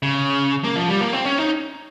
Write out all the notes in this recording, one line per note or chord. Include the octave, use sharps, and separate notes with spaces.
C#3
A#3
F3
G3
A#3
C4
C#4
D#4